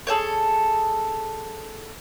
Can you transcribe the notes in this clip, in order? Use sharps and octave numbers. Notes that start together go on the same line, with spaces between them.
G#4 A4 C5 C#5